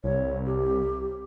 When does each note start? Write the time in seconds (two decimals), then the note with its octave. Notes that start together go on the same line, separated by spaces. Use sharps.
0.04 C2 C#5
0.45 G4